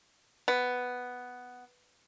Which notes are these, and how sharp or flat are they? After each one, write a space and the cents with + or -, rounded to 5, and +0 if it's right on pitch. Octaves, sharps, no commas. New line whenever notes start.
B3 +5